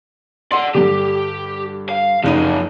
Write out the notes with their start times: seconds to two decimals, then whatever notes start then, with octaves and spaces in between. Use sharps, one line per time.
0.52 D5 F#5 C6
0.75 G2 D3 G4
1.89 F5
2.24 F#1 C3 F3 D#4 D#7